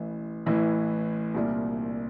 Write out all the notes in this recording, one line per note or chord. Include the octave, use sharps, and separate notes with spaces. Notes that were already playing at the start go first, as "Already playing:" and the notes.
Already playing: A1 A2 E3
A1 A2 E3
C2 A#2 G3 A#3 D4